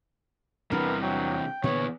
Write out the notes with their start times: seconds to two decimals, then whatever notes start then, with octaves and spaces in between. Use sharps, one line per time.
0.71 E2 C3 E3 G3 B3 D4 A#4
1.02 F#3 G5
1.63 E2 A#2 D3 B3 C#5